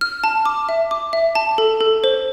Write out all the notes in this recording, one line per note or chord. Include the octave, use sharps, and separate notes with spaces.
F6
A5
D6
E5
D6
E5
A5
A4
A4
C5